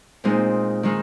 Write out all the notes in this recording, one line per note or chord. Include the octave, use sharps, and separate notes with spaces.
A#2 G#3 C4 D#4
D#3 G#3 D#4